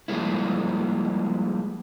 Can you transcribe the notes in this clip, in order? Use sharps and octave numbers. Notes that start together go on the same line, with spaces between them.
F3 G3 G#3 A#3 E4